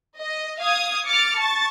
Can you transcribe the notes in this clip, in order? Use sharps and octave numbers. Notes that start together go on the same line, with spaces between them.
D#5
F5 D#6 G#6
D6 F6 A6 C#7
A5 C#6 A6